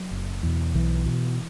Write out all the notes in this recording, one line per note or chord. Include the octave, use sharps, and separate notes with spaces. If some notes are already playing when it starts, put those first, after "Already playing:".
Already playing: F#3
F#1
E2 B2
B1 E3
B2